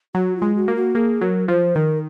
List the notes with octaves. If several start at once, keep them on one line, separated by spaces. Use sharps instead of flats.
F#3 F#4
F4
G#3
F#4
A#3
F#4
A#3 G#4
F#3 A#4
F3 C5
D#3 A#4